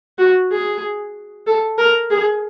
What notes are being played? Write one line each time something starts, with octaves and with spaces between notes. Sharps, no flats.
F#4
G#4
A4
A#4
G#4